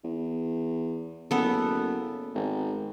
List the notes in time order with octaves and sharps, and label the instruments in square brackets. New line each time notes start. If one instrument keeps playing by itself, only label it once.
[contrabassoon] E2
[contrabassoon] F#1 [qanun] B3 A4
[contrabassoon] G#1